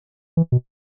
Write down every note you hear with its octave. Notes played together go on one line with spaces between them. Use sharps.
E3
B2